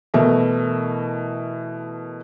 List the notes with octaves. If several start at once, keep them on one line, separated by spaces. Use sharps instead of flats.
B2 E3 A3 A#4